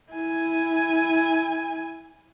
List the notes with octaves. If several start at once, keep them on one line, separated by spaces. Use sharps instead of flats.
E4 G#5